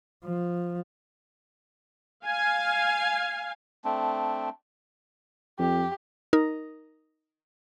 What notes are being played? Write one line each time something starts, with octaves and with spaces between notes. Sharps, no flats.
F3
F5 G#5
A3 C4 D4
F2 G4
D#4 A#4